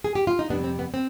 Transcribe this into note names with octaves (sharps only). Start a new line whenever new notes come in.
G#4
G4
F4
D#4
F2 C3 G3 B3 D4
C4
B3
C4